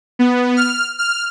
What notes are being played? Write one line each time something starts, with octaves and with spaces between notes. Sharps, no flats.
B3
F6
F6